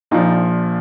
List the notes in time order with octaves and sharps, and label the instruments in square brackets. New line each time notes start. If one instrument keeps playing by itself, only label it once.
[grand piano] A#1 A#2 F3 D#4